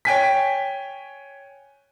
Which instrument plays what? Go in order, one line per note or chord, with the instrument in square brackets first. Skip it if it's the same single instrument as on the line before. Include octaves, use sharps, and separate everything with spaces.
[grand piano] C#5 G5 G#5 B6